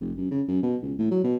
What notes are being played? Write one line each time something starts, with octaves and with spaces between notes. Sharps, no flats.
F1
F#2
C#3
F#2
B2
C#2
A2
F#3
B2